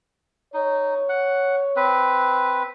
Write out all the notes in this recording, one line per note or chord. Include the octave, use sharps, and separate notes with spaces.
D#4 C#5
F#5
C4 B4